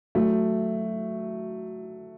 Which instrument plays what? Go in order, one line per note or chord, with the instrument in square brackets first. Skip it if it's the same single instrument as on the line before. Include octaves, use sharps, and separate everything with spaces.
[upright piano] F#3 A3